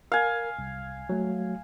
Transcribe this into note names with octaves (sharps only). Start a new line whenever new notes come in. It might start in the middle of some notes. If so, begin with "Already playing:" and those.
A#4 F5 G#5
C2
F#3 A3